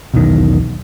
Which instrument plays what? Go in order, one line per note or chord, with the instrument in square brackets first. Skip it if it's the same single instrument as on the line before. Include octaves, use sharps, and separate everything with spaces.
[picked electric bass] E1 B1 E2 D#3